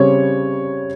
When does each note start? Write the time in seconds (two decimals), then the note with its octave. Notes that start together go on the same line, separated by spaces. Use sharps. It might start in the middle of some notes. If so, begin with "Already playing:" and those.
Already playing: C#3 G3 C4 C#5